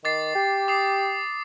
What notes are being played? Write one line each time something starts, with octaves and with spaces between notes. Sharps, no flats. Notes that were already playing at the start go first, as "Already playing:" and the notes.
D#3 D6 A6 C7
G4
D6 D#6 C7